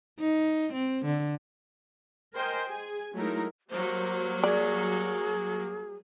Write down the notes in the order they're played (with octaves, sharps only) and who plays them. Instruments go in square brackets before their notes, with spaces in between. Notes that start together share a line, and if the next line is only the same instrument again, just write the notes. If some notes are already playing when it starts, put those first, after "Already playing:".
[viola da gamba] D#4
C4
D3
[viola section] A#4 C5 D#5 G5 G#5
G#4 G#5
F#3 G#3 A3 D#4 E4 A#4
[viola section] F#3 G3 A#3 [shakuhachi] C5
[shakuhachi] G#4 [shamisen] D5